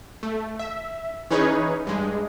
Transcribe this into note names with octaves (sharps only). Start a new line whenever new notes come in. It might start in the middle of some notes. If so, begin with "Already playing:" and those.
A3
E5
E3 C#4 D#4 G#4 B4 C#5
G2 G#3